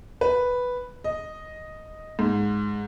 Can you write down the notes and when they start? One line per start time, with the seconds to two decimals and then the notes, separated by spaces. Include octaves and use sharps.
0.21 B4
1.04 D#5
2.19 G#2